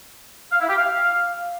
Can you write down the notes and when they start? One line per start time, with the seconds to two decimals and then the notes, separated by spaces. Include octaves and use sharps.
0.52 F5
0.60 E4
0.68 G4
0.76 F5